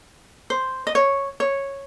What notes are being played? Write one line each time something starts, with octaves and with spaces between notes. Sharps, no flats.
C5
D#5
C#5
C#5